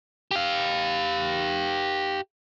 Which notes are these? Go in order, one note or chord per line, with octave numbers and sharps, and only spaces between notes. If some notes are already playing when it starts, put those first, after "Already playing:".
G4 F5